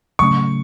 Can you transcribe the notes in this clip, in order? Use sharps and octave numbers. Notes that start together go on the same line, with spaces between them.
C#3 F#3 A3 C#4 C#6